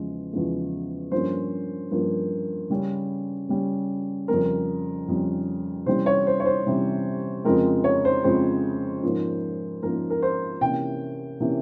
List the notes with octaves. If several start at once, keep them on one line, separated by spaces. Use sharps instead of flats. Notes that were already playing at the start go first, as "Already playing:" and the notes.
Already playing: E2 C#3 F3 G#3
E2 C#3 F3 G#3
G2 F3 A#3 C#4 C5
G2 F3 A#3 C#4
C#3 G3 C#4
C#3 G3 C#4
F2 C#3 G3 C#4 A#4
F2 C#3 G3 C#4
C3 E3 G3 C#4 C5
C#5
C5
C#5
C5
C3 E3 G3 C#4
F2 C#3 F3 G#3 C4 A#4
C#5
C5
F2 C#3 F3 G#3 C4 C5
G#2 F3 A#3 C#4
G#2 F3 A#3 C#4 A#4
A#4
C5
C3 E3 A#3 C#4 G5
C3 E3 A#3 C#4